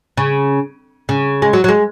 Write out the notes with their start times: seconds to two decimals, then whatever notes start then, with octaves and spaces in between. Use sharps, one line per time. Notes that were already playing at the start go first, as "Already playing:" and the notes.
0.17 C#3
1.09 C#3
1.42 G#3
1.53 F#3
1.64 F#3
1.68 G#3